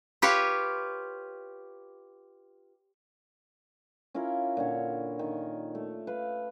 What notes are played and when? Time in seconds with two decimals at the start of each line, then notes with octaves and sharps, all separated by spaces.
0.22 F4 G4 B4 C#5
4.14 C#4 E4 F4 A#4
4.57 A#2 D3 C#5
5.19 D#3
5.75 A3
6.07 B4 F5